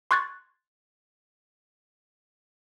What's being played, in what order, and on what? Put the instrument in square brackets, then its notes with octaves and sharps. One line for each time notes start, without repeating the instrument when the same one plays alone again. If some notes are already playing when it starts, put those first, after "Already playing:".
[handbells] C6 C#6 F#6 G#6 A6